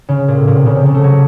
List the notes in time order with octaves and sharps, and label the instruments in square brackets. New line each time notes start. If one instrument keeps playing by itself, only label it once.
[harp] C#3
A#2
A2
A#2
C3
C#3
C3
C#3
A3
F#3